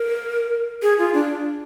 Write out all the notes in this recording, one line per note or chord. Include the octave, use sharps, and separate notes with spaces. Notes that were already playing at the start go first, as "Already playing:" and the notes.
Already playing: A#4
G#4
F4
D4